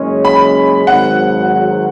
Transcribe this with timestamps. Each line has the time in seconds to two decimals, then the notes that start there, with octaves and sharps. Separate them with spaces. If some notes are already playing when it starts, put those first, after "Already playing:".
Already playing: F#1 F#2 C#3 G#3 C#4
0.25 B5
0.87 G#1 G#2 F#3 F#5